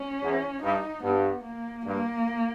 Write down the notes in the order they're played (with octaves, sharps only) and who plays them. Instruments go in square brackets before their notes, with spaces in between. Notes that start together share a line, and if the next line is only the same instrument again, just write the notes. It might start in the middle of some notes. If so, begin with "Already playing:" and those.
Already playing: [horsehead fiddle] C#4
[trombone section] E2
[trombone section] G2 [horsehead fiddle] D#4
[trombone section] G2 [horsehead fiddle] B3
[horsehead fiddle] A#3
[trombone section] G2 [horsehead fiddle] A#3